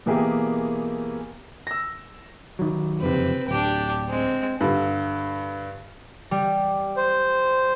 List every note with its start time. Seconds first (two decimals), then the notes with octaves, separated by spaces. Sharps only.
0.06 B2 E3 A#3 G4 G#4 A#4
1.67 E6 A#6
2.59 D#3 F#3
3.01 F#1 F2 C3 C4 B4
3.48 D1 D4 G4
4.10 G#3 C4
4.61 G2 D3
6.31 G3
6.97 C5